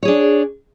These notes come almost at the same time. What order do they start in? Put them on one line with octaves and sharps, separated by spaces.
C#5 G#4 D4